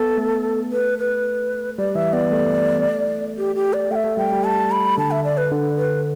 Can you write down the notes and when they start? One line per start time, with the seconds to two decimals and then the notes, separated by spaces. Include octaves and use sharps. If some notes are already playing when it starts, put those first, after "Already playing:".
Already playing: B3 A4
0.18 A3
0.72 B4
0.98 B4
1.78 G3 D5
1.95 E3 E5
2.13 B3 D5
2.32 A3
3.38 G4
3.56 G4
3.73 D5
3.91 A3 G5
3.95 E5
4.04 A3
4.17 G3 G5
4.32 G3
4.44 A5
4.72 B5
4.98 D3 A5
5.11 E5
5.24 D5
5.37 B4
5.51 D3
5.78 B4